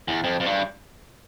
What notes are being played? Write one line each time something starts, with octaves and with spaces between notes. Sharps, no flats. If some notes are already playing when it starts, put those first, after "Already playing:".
E2
F2
F2
G2